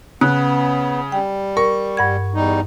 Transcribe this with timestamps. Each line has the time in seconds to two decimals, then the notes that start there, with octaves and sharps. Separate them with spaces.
0.21 C#3 B3 F#6
1.12 G3 G5
1.57 A#4 C#6
1.97 G2 F#5 G#6
2.35 E2 G3 D#4